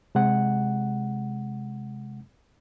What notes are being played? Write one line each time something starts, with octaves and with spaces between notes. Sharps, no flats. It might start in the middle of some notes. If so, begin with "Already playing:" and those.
C3 G#3 F#5